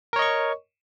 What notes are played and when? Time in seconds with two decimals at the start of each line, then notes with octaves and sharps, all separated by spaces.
0.13 A#4
0.16 C#5
0.19 D#5
0.22 C#6